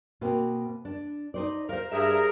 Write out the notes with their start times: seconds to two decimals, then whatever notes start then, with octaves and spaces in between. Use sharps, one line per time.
0.21 B2 A#3 C4
0.85 D4
1.34 D#4 C5 D5
1.69 A#4 C5 F5
1.92 G2 G#4 A#4 E5